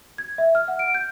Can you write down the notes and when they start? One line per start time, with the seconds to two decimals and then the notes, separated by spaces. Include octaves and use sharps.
0.18 G#6
0.38 E5
0.55 F6
0.68 F#5
0.79 D7
0.95 G6